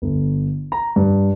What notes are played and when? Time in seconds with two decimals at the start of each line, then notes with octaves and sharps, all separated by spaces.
0.02 G1
0.72 A#5
0.96 G2